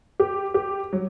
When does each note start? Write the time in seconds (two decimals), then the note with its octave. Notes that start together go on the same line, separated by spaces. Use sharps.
0.20 G4
0.54 G4
0.93 F#3